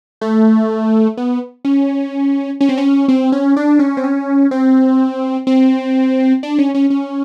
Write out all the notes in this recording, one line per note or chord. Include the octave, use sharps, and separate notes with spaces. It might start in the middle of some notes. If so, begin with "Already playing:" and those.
A3
B3
C#4
C#4
C4
C#4
C4
C#4
D4
C#4
C4
C#4
C4
C4
D4
C#4
C#4
C#4